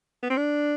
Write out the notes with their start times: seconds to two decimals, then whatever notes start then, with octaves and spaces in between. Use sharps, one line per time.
0.23 B3
0.30 C4
0.37 D4